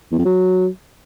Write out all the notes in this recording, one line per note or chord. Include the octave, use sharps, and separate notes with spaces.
E2
F2
F#3